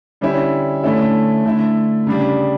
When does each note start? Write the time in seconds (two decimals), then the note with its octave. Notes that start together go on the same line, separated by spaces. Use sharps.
0.21 D3 G3 C#4 E4
0.83 D3 A3 C#4 E4
1.45 D3 A3 E4
2.07 C#3 G3 D4